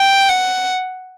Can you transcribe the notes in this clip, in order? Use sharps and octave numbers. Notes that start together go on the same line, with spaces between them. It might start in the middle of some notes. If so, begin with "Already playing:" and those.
Already playing: G5
F#5